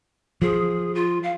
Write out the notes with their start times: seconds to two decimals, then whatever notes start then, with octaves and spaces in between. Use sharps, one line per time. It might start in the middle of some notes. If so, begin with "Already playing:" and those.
0.42 F3 G#4
0.95 F4
1.23 F5